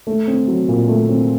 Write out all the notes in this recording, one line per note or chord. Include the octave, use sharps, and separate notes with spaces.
A3
C4
F#3
A#2
A3
C4